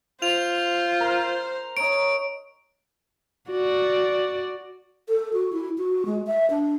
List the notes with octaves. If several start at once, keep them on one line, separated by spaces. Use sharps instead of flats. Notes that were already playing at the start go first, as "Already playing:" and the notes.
F4 C5 F7
A#4
D#4 C#5 D7
F#4 D5
A4
F#4
E4
F#4
G#3
E5
D4